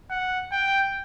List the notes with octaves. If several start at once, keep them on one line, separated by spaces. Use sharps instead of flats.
F#5
G5